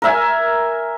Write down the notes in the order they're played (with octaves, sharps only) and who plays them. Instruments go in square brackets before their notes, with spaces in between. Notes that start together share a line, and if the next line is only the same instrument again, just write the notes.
[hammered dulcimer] A#4 E5 G#5